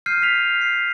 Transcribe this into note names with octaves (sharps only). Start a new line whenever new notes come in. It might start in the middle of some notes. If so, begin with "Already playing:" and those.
F6 G6 C7 D#7
B6 F7
C7